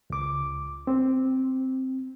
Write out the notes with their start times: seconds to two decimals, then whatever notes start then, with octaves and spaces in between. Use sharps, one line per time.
0.10 C#2 D6
0.87 C4